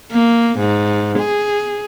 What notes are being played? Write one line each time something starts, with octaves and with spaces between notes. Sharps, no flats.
A#3
G#2
G#4